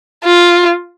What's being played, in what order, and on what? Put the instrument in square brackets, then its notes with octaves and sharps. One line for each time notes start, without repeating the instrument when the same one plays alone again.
[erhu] F4